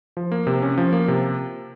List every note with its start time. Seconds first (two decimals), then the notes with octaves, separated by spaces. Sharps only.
0.17 F3
0.32 A#3
0.47 C3
0.62 C#4
0.78 F3
0.93 A#3
1.08 C3